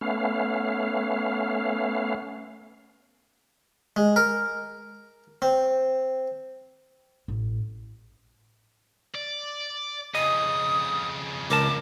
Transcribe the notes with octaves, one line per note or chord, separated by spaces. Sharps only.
A3 B3 C#4 F5
G#3
A#4
C4
A1
D5
F2 C#3 D#5 D#6
C#2 A#4 A5 D6